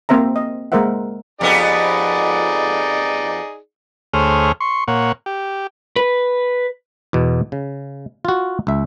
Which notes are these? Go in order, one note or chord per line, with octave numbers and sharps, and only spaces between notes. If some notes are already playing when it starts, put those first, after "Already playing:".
A#3 C4 C5 E5 A#5
D#5
G#3 A#3 A#4 C5 E5 F#5
F2 B3 D#4 G4 G#4 D5
D2 A3 G#4 C5 C#5 F6
C6 C#6
A#2 A#3 C#5 F#5
G4
B4
E2 B2
C#3
F4 F#4
C#2 E5